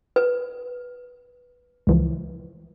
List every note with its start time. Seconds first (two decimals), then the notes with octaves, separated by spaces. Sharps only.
0.16 B4
1.87 C#2 E3 F3